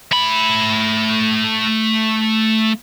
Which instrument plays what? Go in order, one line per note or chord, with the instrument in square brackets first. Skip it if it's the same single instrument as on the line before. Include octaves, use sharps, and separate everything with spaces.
[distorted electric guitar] A3 B5